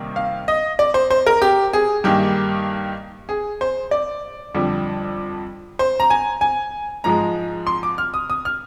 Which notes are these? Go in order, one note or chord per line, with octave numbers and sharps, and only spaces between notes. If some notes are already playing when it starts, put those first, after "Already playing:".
Already playing: C3 D#3 G3 A#3
F5
D#5
D5
C5
C5
A#4
G4
G#4
G2 D#3 A#3 G4
G#4
C5
D5
F2 D3 G3
C5
A#5
G#5
G#5
G#2 F3 G#3 A#5
C6
D6
F6
D#6
D#6
F6